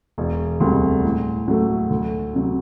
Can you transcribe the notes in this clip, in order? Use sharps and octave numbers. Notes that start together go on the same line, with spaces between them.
E1
D2 C3 G3
A2
F#3 A3
D2
C3 F#3